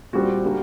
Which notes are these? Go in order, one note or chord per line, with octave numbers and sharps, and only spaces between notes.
A#2 G3 C4 F#4
D3 G3 A#3